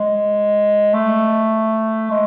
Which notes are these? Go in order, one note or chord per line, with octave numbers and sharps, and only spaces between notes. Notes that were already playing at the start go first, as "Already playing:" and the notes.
Already playing: G#3
A3
G#3